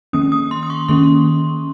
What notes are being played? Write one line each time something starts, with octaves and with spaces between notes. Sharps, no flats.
D#3 A#3 C#4 D#6
D#6
C6
D#6
C#6
D#3 A#3 C#4 C6